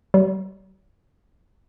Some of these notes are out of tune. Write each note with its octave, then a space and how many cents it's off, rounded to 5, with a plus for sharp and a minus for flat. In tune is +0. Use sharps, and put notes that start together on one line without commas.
G3 -40